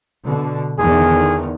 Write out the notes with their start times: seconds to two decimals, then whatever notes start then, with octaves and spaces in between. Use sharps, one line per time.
0.23 B2 D3
0.79 E2 D3 D#3 G#4